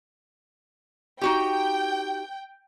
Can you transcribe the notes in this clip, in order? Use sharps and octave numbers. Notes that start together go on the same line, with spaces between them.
D#4 F#4 G4 G5